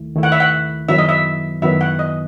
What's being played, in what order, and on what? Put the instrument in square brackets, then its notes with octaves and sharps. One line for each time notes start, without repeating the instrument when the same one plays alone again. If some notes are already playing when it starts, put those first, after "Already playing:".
Already playing: [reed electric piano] D#2 D#3 A3 E4
D#2 D#3 A3 E4
[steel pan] F#5
E5
F#5
[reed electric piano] F#2 D#3 F#3 B3 E4 [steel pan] E5
[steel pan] D#5
E5
[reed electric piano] F#2 D#3 F#3 B3 E4 [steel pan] E5
[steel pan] F#5
D#5